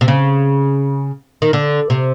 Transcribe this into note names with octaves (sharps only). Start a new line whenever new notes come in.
C3
C#3
D#3
D3
C3